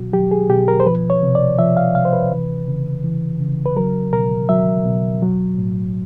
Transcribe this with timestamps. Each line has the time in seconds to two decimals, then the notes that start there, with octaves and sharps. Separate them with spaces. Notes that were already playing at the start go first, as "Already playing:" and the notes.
Already playing: B2 F#3 F#4
0.13 F#3 G4
0.31 G#4
0.50 B2 G4
0.68 A#4
0.80 C5
0.86 F3 B4
1.10 C#5
1.23 C3
1.35 D5
1.59 F3 E5
1.77 F5
1.95 C3 F5
2.05 C5
2.13 B4
2.31 E3
2.68 C#3
3.04 E3
3.40 C#3
3.66 B4
3.77 F#3 A#4
4.13 B2 A#4
4.49 F#3 E5
4.85 B2
5.22 F#3
5.58 A2